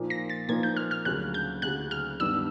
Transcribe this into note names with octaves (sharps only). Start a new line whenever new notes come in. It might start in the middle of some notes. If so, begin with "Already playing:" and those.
Already playing: A#2 F3 A#3 D#4
A#6
A6
A#2 F3 A#3 D#4 G#6
G6
F6
F6
D2 C#3 F#3 F#6
G6
D2 C#3 F#3 F#6
F6
G2 D#3 G3 B3 D4 E6